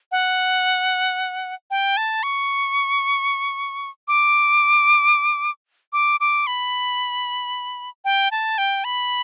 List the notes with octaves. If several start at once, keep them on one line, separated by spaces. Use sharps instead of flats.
F#5
G5
A5
C#6
D6
D6
D6
B5
G5
A5
G5
B5